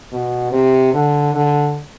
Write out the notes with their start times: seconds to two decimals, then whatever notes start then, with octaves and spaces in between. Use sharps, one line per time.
0.12 B2
0.52 C3
0.94 D3
1.33 D3